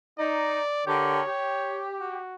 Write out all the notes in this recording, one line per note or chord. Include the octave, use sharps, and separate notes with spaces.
D#4 D5
D3 G4 A#4 C#5
G4
F#4